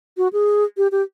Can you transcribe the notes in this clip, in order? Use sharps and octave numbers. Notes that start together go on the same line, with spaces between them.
F#4
G#4
G4
G4